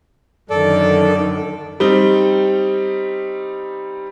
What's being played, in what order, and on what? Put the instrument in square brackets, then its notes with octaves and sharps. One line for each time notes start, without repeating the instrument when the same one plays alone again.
[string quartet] F#2 D3 D#3 [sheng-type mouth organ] A4 D5
[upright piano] G3 C4 D#4 G7